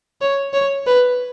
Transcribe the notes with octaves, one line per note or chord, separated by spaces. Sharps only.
C#5
C#5
B4